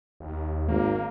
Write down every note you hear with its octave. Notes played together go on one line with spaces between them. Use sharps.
D#2
G#1 A#3